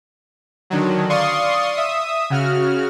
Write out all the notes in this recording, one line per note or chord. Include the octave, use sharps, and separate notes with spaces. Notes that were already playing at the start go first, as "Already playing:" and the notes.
D3 D#3 F#3
D5 F5 C6 C#6 D#6
E5 D#6
C#3 F#4 F6